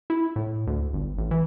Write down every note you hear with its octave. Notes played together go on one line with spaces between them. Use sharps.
E4
A2
D2
G1
A1
E3